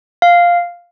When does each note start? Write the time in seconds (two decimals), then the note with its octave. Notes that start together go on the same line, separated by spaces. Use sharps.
0.22 F5